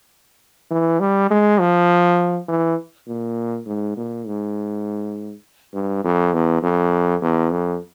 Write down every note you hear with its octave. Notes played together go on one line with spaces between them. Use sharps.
E3
G3
G#3
F3
E3
A#2
G#2
A#2
G#2
G2
F2
E2
F2
E2
F2